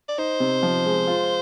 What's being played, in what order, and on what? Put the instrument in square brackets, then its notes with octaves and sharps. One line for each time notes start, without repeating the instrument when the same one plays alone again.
[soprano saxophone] D5
[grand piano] D#4 [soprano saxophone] C5
[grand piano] C3
F3
G#3
F4